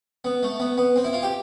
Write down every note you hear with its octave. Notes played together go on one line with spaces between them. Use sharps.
B3
A3
B3
B3
C4
E4
F4
G4